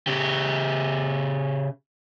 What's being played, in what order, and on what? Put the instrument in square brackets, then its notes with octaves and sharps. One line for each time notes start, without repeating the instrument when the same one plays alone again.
[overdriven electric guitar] C#3 G4